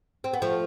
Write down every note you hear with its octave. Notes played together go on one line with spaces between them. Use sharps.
C4
B3
F3 A3